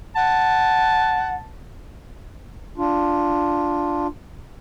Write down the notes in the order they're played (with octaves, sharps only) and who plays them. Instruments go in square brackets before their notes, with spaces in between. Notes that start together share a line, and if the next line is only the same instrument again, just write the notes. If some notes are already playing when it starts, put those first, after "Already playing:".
[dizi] F#5 [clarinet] A5
[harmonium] D4 F4